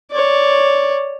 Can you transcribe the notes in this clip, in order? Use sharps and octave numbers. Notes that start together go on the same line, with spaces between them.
C#5 D5